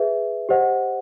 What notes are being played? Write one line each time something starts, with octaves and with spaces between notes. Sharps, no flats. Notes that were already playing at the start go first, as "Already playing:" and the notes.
Already playing: G#4 B4 E5
G4 C5 D#5 F#5